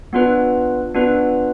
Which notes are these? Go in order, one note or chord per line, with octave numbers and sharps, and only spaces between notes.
B3 D4 F4 B4
B3 D4 F4 B4